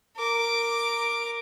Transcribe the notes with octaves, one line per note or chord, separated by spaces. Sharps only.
A#4 D6